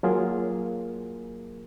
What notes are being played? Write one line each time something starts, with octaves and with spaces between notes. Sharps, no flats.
F#3 A#3 F4 G#4 A#4